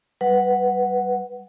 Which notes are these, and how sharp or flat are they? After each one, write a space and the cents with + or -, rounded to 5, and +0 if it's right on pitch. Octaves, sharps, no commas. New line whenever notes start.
G3 -15 B4 +0 F#5 +0